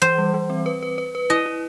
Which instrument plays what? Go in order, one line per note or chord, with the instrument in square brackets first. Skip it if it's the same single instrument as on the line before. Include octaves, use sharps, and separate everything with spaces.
[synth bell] E3 [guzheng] C5
[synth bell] G3
E3
C4
B4
B4
B4
B4
[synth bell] E4 [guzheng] D#5
[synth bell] E4